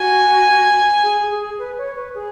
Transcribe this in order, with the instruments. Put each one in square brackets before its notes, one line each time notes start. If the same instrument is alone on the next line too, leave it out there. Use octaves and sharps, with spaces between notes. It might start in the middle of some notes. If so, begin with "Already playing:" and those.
Already playing: [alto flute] F#4 [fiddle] G#5
[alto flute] G#4
G#4
B4
C#5
B4
G#4